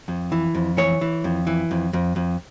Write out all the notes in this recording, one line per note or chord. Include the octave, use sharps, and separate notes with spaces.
F2
E3
F2
E3 C#5
E3
F2
E3
F2
F2
F2